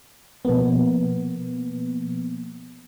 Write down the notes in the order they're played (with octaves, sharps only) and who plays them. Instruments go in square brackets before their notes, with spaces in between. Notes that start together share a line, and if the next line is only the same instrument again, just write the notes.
[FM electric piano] B2 F3 A#3 B3